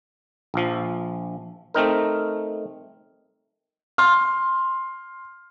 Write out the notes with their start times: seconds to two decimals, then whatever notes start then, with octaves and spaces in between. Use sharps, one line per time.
0.54 A#1 F3
1.74 A3 C4 D#4 A#4
3.98 C6 F6